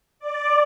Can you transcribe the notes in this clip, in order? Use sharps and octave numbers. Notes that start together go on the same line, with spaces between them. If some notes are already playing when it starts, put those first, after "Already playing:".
D5